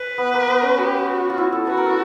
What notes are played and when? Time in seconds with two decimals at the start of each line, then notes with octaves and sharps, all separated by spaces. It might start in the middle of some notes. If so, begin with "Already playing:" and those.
Already playing: B4
0.18 B3
0.34 A#3
0.48 B3
0.62 C#4
0.78 G4
1.08 F#4
1.30 F4
1.38 E4
1.52 A4
1.67 F#4 B4
1.77 A#4
1.86 A4